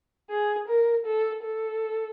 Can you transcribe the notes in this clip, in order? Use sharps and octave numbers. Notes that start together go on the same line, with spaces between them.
G#4
A#4
A4
A4